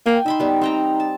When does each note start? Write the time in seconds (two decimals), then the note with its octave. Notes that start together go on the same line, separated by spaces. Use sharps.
0.06 A#3 G5 G#5
0.26 D#4 E5 B5 C6
0.40 G3 B3
0.61 C4 G5 A#5
1.00 A5